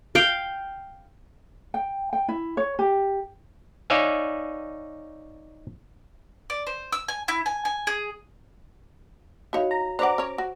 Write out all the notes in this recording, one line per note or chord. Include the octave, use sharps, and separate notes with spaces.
F5 G5
G5
G5
E4
C#5
G4
D#4 C#5 D5 E5 F5 G#5
D5
C5
E6
G#5
E4
G#5
G#5
G#4
D#4 E4 F#4 C#5 F5
A#5
D4 B4 C5 F#5 A#5 D6
C#4 C#5
F#4